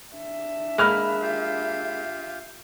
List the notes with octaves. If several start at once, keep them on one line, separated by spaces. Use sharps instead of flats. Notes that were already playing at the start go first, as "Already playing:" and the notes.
D4 E5
G#3 A#3 B5 F6 F#6
F4 G4 F5